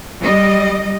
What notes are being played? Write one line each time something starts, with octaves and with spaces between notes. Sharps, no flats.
G3 D#5